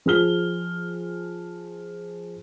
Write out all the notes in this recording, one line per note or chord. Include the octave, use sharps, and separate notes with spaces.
F3 G#4 F6 G7